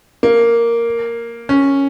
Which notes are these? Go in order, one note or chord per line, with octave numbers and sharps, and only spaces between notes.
A#3
C#4